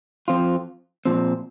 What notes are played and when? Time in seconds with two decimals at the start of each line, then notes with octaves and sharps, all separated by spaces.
0.28 F2 F3 C4 F4
1.05 A#2 F3 C4